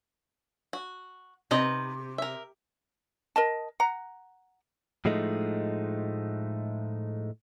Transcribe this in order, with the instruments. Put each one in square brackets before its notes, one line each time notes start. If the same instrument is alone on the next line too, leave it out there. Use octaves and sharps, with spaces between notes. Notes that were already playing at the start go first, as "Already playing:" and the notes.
[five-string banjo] F#4
[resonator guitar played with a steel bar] C3 [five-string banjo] D#4 B4 D#5
[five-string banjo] A#4 E5
[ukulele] A#4 D#5 A5
F#5 A#5
[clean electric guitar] A2 F3 G#3 A3 D#4